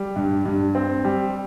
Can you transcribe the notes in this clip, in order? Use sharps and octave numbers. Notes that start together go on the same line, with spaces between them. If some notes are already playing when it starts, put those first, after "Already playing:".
Already playing: G3
G2
G2
C4
G3